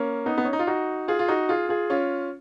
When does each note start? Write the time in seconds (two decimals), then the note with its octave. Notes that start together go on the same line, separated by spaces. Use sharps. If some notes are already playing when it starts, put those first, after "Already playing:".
Already playing: A#3 C#4
0.26 B3 D#4
0.38 B3
0.45 C#4
0.53 D#4
0.59 F4
0.67 D#4 F#4
1.08 F4 G#4
1.19 F4
1.28 D#4 F#4
1.49 F4 G#4
1.69 F4 G#4
1.90 C#4 F4